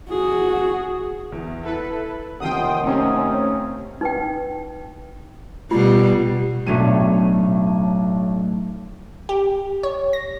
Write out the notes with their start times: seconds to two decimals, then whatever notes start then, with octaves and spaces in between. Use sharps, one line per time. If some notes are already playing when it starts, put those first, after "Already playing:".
0.11 F#4 G#4
1.32 E2
1.63 E4 A4 B4
2.40 D#2 C3 D#3 F3 F#5 G5 C6 D#6
2.84 C3 A3 C4 C#4 A#5 D#6
4.01 D#4 B4 G5
5.71 B2 G3 F4
6.67 B1 A2 F#3 A3 D4 D#7
9.29 G4
9.83 C#5
10.13 A#6